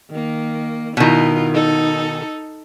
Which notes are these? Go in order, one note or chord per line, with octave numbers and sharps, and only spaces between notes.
D#3 A#3
B2 D#3 E4 F4
D#4 A4